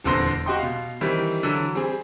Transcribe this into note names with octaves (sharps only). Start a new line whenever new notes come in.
D#1 E2 D3 C4 C6 A#6
F#4 G4 D#5 G5 C6
B2 F5
D#3 E3 G3 C4
D3 E3 F#3
G3 C4 G#4